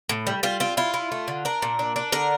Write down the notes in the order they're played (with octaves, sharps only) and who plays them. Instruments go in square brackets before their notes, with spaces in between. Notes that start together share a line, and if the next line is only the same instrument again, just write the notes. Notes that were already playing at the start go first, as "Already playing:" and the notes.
[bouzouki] A2
G3
G3 F4
C4 F4
E4 F4
E4
A3
D3
D4 A#4
A#2
D4
D4
D3 A#4